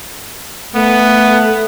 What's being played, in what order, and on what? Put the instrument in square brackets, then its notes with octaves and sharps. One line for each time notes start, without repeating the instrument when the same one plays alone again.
[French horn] A3 [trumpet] B3